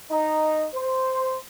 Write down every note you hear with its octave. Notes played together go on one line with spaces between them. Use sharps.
D#4
C5